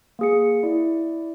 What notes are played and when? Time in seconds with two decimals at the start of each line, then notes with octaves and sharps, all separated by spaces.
0.19 A#3 G#4 C#7
0.63 E4 D5